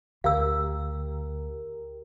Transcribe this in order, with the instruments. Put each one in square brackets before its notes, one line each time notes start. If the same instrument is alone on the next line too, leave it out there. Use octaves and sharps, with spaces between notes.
[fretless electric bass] D2 [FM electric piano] G4 A#4 [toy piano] F5 E6